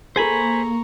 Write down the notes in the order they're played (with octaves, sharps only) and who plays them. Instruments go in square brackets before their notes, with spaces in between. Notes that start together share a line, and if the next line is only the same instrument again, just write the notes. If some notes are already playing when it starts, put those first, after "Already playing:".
[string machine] A#3 [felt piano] G#4 A4 [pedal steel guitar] C5 G#5 B5 [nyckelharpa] A#5 C#6